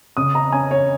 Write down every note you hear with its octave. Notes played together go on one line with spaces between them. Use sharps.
C#3 D#6
A#5
C#4 G#5
C#5